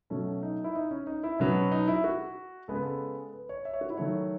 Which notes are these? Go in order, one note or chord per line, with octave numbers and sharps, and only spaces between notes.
B2 F#3 A3 C#4
D#4
E4
D#4
C#4
D#4
E4
B2 F#3 B3 C#4
D#4
E4
F#4
C#3 G#3 B3 A4
B4
A4
B4
C#5
E5
C#5
F#4
E4
D#3 F#3 A3 C#5